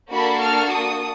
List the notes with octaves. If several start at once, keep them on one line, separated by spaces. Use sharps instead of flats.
A#3 D4 F#4 A4 B5
F6
D#6